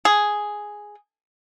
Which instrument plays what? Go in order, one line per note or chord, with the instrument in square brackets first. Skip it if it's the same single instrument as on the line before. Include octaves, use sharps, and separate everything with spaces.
[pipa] G#4